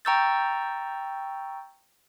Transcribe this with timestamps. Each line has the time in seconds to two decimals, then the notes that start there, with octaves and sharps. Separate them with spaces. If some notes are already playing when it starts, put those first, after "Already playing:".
0.05 G5 A#5 C#6 E6 G6 A6